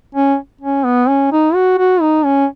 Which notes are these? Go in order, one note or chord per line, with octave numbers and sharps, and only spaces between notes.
C#4
C#4
B3
C#4
D#4
F#4
F#4
D#4
C#4